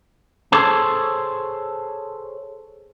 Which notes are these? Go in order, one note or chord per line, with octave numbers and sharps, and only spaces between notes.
G#4 A4 C5 C#5 A5